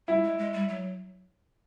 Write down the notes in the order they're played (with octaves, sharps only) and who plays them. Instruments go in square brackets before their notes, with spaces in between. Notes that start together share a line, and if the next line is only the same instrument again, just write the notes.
[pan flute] G3 [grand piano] E4
[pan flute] G#3
G#3
G3
F#3